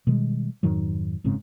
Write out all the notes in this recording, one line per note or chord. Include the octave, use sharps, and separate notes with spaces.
B2 D#3 G3 G#3
F2 G#2 D#3 F#3
F#1 G#2 C#3 C4